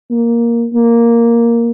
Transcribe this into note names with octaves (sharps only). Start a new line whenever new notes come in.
A#3
A#3